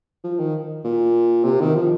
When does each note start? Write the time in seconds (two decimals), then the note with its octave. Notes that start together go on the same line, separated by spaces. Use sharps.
0.24 F3
0.39 D#3
0.84 A#2
1.45 C3
1.61 D#3
1.75 F3